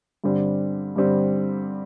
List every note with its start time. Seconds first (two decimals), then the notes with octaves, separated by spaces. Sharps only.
0.24 G2 D3 G3 C4
0.96 G2 D3 G3 C4